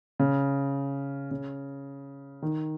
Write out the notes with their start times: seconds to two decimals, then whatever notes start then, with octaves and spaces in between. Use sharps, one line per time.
0.19 C#3
1.31 C#3
2.42 D#3